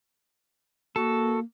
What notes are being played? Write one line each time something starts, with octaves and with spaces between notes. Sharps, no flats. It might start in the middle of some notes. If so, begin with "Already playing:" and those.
A#3 F#4 A4